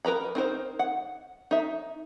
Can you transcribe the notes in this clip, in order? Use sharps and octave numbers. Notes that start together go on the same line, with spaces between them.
A#4 B4 A#5 B5
C4 D#4 A#4 C5
F#5
D#4 E5